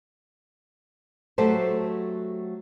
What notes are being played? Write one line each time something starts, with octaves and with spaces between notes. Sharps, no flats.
F#3 A3 F#4 G4 A4 C5